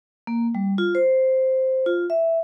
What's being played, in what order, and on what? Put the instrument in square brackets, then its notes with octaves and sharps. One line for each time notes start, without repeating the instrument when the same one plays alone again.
[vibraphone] A#3
G3
F4
C5
F4
E5